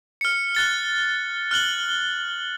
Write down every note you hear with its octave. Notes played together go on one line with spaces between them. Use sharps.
F6 C#7
F#6 A6 G7
F6 F#6 F#7 G7